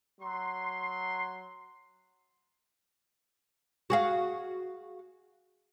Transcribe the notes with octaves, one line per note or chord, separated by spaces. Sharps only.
F#3 C6
F#4 G#4 F5